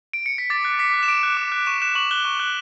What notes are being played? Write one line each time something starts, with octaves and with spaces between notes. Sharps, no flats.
D7
C#7
B6
D6 A6
F#6
D6 B6
F#6
E7
D6 D7
F#6
D6
F#6
C#6 E7
F#6 E7
C#6 F#7
F#6 G7
C#6
F#6